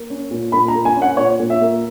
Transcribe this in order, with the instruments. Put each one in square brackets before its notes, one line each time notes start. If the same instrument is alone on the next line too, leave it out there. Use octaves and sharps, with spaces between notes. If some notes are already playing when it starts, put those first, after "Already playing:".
Already playing: [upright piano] A#3
C#4
A#2
A#2 B5
A#5
A#3
G#5
C#4
F#5
A#2 C#5
A#2
E5
A#3